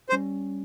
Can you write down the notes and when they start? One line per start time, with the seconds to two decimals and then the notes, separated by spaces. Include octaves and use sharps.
0.09 C5
0.12 G3 C#4